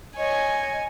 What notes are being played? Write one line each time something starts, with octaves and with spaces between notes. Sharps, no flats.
C#5 D#5 G#5